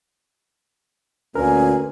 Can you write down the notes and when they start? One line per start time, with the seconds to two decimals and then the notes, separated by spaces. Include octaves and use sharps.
1.35 D2 A#2 C#4 A#4 B4 G#5